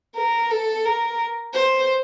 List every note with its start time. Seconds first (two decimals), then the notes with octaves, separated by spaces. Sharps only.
0.17 A#4
0.51 A4
0.85 A#4
1.54 C5